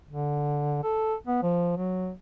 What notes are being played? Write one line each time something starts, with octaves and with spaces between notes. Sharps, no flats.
D3
A4
B3
F3
F#3